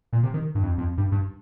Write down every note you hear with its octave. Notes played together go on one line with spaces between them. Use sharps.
A#2
C3
D#3
G2
F2
F2
G2
G2